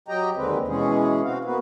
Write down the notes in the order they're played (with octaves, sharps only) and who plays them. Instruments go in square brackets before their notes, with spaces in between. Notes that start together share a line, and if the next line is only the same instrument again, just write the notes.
[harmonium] F#3 G4 D#5 G5 A#5
D#2 D3 G#3 C4 B4
B2 E3 G#3 C#4 G#4
C4 F#4 F5
A#3 B3 F#4 B4